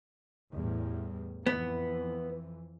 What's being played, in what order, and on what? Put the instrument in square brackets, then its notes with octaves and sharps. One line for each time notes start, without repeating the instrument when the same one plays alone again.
[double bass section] E2 A2 G3
[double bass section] F2 E3 [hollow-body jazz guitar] B3